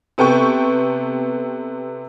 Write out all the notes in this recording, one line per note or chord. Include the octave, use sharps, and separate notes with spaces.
C3 B3 A4 G5 C#6